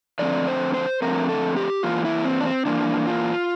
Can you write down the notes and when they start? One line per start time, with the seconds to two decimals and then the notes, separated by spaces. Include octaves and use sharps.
0.19 D3 F3 A3 C4 D5
0.47 C5
0.74 C5
1.02 D3 F3 A3 C4 A#4
1.29 A4
1.57 G4
1.83 E3 A#3 F4
2.05 E4
2.24 C4
2.40 D4
2.45 C4
2.66 E3 A#3 D4
3.07 F4